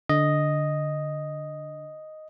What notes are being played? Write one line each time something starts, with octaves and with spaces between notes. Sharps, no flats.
D3 D#5